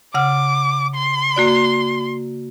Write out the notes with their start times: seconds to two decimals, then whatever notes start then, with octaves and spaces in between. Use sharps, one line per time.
0.14 C#3 F#5 D6 F6
0.95 C6
1.36 A#3 F#4 D5